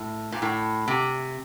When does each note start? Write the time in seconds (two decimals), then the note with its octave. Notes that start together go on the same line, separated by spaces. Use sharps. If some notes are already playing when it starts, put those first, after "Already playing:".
Already playing: A2
0.32 A#2
0.42 A2
0.88 C3